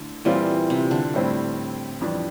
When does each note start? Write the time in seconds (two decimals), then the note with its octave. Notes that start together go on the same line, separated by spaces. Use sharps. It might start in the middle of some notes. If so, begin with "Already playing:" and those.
Already playing: D3 A3 E4
0.25 A#2 E3 G3 C4 F4
0.70 C3
0.91 D3
1.14 A2 G3 C4 E4
2.01 F2 E3 G3 D4